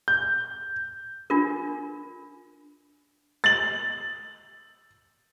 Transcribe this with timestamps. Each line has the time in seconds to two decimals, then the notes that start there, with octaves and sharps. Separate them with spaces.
0.08 G6
1.30 D4 F4 A#4
3.44 A6 F#7